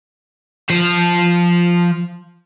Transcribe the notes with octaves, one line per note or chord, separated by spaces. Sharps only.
F3 C5